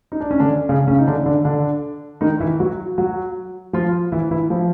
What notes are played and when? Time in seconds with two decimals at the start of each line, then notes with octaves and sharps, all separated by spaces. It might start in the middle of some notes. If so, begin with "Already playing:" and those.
0.12 D#4
0.20 D4
0.31 C#4
0.40 D3 D4
0.69 C#3 C#4
0.87 C#3 C#4
0.98 D#4
1.07 D3 D4
1.26 D3 D4
1.45 D3 D4
2.21 D#3 D#4
2.40 E3 E4
2.60 F#3 F#4
2.98 F#3 F#4
3.73 F3 F4
4.12 E3 E4
4.31 E3 E4
4.50 F3 F4